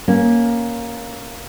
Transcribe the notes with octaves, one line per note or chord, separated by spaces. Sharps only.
A#3 C#4